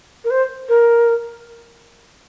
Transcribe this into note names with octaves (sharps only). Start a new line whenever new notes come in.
A#4
C5
A#4